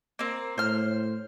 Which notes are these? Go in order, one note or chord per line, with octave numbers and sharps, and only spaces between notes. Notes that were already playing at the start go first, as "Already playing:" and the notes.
A#3 C4
A2 C5 F6